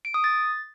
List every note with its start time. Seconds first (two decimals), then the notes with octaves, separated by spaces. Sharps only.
0.05 D7
0.14 D#6
0.24 A6